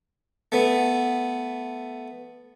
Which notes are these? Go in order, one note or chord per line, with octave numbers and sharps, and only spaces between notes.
A3 B3